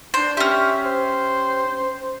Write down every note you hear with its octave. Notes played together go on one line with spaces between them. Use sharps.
D4 C5
C#4 G4 E5
C5